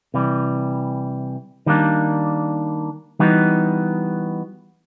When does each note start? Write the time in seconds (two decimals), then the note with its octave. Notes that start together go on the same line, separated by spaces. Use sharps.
0.14 C3 E3 G3
1.66 D#3 G3 A#3 D4
3.19 E3 G3 B3 D#4 F#4